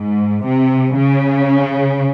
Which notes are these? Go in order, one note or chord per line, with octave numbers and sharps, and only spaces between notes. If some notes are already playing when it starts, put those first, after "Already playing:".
Already playing: G#2
C3
C#3